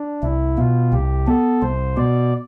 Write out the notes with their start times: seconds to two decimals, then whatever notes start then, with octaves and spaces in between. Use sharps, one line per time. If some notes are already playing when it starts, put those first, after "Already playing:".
Already playing: D4
0.23 C2 E4
0.58 B2 F4
0.93 C2 G4
1.27 B3 A4
1.62 C2 C5
1.97 B2 D5